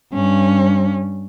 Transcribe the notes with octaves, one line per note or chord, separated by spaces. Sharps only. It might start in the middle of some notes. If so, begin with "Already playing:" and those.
G2 C#4